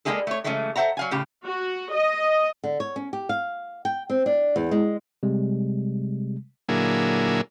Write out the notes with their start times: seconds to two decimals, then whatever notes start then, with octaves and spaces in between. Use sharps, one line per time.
0.05 G3 G#3 A#3 E4 G#4 A4
0.27 A3 C#5
0.44 C#3 E3 F#3 G#3 A3
0.76 A4 C5 E5 F#5 A#5
0.97 F#3 F5 G#5
1.11 A2 C#3 G4
1.46 F#4
1.94 D#5
2.64 D3
2.80 C#5
2.96 C#4
3.13 G4
3.29 F5
3.85 G5
4.10 C4
4.26 D4
4.56 E2
4.71 G#3
5.23 C3 G3 G#3
6.69 A#2 D3 F#3 A#3 E4 G#4